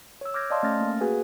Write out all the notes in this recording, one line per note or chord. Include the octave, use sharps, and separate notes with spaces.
C#5 E6
D6 F6 G6 G#6 A#6
D5 D#5 F5 A5 C6 D#6
A3 C#4 F6 A6 A#6
A#3
F#4 G#4 B4 G#5